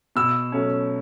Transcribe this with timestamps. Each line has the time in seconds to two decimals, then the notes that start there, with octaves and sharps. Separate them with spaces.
0.16 B2 E6
0.52 F#3 A3 C#4